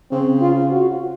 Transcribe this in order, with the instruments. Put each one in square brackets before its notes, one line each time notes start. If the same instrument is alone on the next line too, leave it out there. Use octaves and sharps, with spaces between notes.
[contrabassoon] C#3 [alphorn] C4
[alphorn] F4
F#4